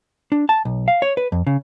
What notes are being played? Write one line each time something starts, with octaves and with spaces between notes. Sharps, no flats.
D4
A5
B1
F5
C#5
B4
F2
C#3